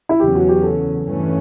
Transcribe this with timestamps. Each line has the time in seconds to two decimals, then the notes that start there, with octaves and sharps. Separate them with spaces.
0.09 E4
0.20 E2 C#3 F#3 C#4 G4
0.35 F#4
0.49 G4
0.63 A4
1.05 G2 E3 A3 C#4